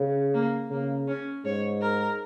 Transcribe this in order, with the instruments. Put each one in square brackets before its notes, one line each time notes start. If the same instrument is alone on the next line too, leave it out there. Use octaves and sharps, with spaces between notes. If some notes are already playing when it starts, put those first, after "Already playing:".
Already playing: [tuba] C#3
[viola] A#3
[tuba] C#3 [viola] A#3
[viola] C#4
[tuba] G#2 [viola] C#5
[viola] A#4